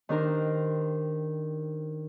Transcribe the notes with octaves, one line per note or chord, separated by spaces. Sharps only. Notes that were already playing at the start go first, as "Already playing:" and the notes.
D#3 D4 G4 A#4 C5